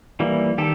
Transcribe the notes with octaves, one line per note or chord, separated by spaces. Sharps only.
E3 G3 A#3
D#3 G4 A4